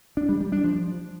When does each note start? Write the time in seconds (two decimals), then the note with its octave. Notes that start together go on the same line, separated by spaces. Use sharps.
0.17 D4
0.29 G3
0.40 G3
0.52 D4
0.64 F3